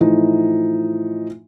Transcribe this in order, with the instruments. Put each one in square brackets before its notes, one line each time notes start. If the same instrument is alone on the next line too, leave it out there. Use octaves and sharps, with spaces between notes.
[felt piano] A2 E3 F3 D#4